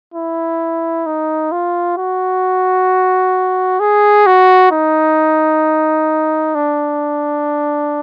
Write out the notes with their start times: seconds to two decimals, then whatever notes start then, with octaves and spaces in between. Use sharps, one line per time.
0.14 E4
1.06 D#4
1.52 F4
1.98 F#4
3.80 G#4
4.27 F#4
4.72 D#4
6.55 D4